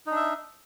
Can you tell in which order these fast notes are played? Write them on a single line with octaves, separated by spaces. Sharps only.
D#4 D4 E5